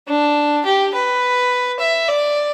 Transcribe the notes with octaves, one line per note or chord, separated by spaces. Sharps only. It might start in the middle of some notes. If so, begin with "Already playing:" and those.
D4
G4
B4
E5
D5